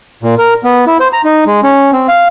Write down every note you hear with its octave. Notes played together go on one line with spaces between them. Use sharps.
A#2
A#4
B3
E4
C5
A#5
D#4
G#3
C#4
C4
F5